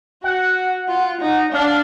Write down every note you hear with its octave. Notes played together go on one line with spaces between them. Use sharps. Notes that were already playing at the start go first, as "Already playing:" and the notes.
F#4 F#5
F4
D#4
D4 F5